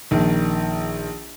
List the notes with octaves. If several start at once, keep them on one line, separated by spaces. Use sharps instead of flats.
A#1 D#3